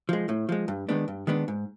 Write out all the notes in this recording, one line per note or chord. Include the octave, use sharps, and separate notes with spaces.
F3 G#3
A2
F3 G#3
G2
D#3 G#3 B3 D4
G2
D#3 G#3 B3 D4
G#2